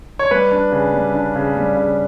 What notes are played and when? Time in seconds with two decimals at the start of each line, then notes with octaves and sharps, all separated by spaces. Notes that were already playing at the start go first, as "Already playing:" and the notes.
0.19 C#5
0.31 G3 B4
0.52 D4
0.72 C#3
0.93 G3
1.14 D4
1.36 C#3
1.56 G3
1.77 C#3